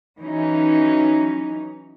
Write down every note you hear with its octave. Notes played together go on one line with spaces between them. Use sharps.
E3 F#3 C#4 D#4